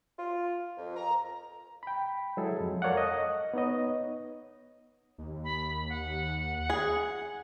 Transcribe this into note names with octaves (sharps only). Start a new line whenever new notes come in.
F4
F2
A#5
G5 B5
F#3 G#3 E4 G#4 A4
F2
A4 A#4 C#5 D5 F5 F#5
D#5
B3 D#4 C#5 D#5
D#2
B5
F#5
G#4